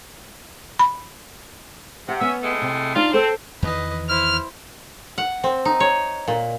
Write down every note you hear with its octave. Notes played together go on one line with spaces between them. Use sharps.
B5
C3 F#5
B3 C#4 E5
A2 G#3 A3
C3
D4 D#4 F4 D5
C4 A4 C5 A5
E2 D#3 E3 B4 D#5
E4 C5 F6
F#5
C4
D#4
C#5
A#2